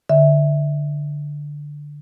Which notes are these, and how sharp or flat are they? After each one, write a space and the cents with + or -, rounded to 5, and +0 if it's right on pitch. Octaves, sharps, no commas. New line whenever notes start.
D3 +0 E5 -10